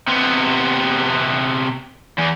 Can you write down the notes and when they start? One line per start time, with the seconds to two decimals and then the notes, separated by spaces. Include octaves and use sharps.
0.08 C3 B3
2.18 E2